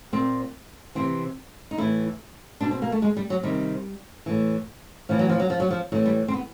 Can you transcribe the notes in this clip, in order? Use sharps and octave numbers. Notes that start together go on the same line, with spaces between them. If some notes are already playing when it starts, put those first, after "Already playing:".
A#2 C4
C3 E3 C4
D#4
A2 E3 E4
B2 D4
C4
A#3
A3
G#3
G3
F#3
C3 D#3 G3
A2 E3
A2 E3 F3
F#3
F3
F#3
F3
F#3
F3
A2 E3 F#3
G3
C4
B3